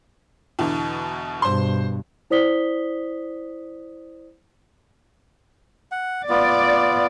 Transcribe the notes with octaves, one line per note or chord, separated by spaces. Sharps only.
E2 B2 D3
G2 B2 C5 C6
E4 C5 D5 D#6 B6 G7
F#5
B3 F4 D5